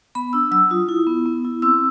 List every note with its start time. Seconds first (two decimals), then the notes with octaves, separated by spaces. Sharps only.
0.15 B3 B5
0.33 D4 E6
0.51 F#3 E6
0.70 F4 D#6
0.89 E4
1.07 B3
1.26 B3
1.45 E4
1.62 C4 E6